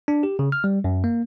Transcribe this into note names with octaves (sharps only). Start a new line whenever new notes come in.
D4
G4
C#3
F6
G3
F#2
A#3